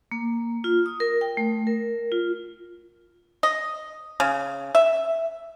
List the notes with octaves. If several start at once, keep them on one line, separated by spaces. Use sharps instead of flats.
A#3
F4
D#6
A#4
G5
A3
A#4
F4
D#5
C#3
E5